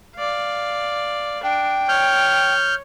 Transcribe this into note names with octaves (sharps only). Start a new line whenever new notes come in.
D5 F5
D4 G5
C#5 F6 G6